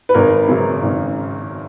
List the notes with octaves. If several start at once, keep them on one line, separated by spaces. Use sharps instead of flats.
B4
G#1 A#4
F#2 C#3 F#3
G#1